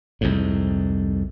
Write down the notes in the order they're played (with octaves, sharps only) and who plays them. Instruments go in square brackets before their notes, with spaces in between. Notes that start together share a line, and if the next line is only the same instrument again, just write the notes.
[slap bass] C2 F2 G#2